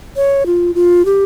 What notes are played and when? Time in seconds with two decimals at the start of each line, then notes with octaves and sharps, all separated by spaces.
0.16 C#5
0.46 F4
0.75 F4
1.05 G4